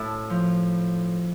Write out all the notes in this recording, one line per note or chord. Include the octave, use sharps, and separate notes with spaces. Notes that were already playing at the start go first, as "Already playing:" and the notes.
Already playing: A2 E4
F3